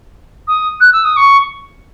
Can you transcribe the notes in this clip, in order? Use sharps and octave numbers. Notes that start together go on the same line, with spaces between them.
D#6
F#6
E6
D#6
C#6